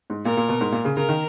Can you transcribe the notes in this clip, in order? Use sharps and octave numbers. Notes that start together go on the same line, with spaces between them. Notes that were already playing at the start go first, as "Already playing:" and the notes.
G#2
A#2 A#4
A#2
B2
G#2
A#2
C#3
C#3 A#4
D#3